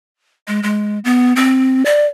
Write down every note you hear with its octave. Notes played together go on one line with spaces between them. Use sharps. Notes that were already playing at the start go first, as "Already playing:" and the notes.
G#3
G#3
B3
C4
D5